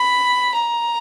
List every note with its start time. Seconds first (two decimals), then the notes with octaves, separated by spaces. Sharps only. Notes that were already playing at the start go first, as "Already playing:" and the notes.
Already playing: B5
0.54 A#5